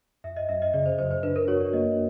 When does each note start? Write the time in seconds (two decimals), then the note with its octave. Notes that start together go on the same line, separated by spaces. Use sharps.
0.24 F#2 E5
0.36 D#5
0.49 F#2 E5
0.62 D#5
0.74 C#3 D5
0.86 C5
0.98 F#2 C5
1.11 C5
1.23 D4 B4
1.36 A#4
1.48 F#4 C#5
1.61 D5
1.73 A#3 D#5